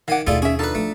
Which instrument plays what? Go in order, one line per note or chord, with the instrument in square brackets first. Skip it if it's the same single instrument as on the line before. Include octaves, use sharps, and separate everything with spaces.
[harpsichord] D#3 G#5 D6 [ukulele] F5 F#5
[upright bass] D#2 B2 [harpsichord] A3 F4 G#4 [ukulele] E4 D5
[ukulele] C#4 E5 [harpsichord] G#4
[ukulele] D4 D#4 F4 [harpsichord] A4 B4
[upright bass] F3 [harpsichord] A3